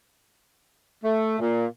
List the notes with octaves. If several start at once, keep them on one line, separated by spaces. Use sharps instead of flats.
A3
A#2